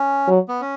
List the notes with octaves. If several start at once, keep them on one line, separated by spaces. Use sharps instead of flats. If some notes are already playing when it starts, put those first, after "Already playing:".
Already playing: C#4
F#3
B3
C#4